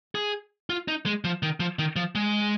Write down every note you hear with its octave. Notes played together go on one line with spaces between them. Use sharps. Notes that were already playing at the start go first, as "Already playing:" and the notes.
G#4
F4
D#4
G#3
F3
D#3
F3
D#3
F3
G#3